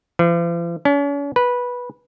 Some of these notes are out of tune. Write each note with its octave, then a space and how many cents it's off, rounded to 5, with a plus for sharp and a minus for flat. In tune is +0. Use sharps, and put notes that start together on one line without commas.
F3 -45
C#4 +40
B4 -10